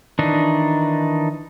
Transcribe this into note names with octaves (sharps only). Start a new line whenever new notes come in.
D#3 E3 D4 D#4